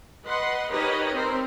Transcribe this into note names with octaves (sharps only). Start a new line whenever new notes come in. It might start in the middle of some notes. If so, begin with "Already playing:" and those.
B4 D#5 F#5 C6
D#4 G4 A#4 B4 C#5 D#5
C4 A#4 C5